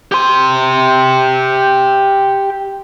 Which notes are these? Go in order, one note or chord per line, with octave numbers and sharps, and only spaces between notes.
G4 C6